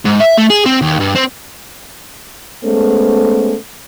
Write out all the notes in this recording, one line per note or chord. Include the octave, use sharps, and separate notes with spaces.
G#2
E5
A3
G#4
C4
D#2
G2
C4
G#3 A3 B3 C#4 A4 C5